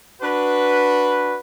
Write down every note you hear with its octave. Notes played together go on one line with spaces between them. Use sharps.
D4 F#4 B4